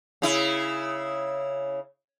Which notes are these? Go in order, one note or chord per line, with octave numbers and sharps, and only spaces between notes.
C#3 E4